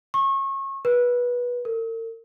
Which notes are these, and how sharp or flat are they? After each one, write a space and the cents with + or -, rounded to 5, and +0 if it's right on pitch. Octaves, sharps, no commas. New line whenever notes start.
C#6 -30
B4 -20
A#4 -45